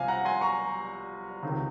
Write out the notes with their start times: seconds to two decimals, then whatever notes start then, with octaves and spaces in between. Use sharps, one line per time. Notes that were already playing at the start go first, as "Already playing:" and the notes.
Already playing: C2 C3 F3 F5 G#5
0.08 F#5 A#5
0.25 G#5 C6
0.41 A#5 C#6
1.43 C#2 C3 D#3